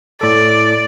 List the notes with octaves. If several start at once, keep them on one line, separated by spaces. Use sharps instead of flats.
A2 A4 D5